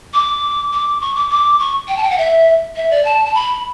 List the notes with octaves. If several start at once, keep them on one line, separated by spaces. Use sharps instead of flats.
D6
D6
C#6
D6
D6
C#6
G5
A5
G5
F#5
E5
E5
D5
A5
A5
B5